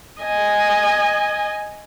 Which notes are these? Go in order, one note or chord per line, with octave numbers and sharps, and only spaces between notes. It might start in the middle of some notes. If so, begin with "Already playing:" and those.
D#5 G#5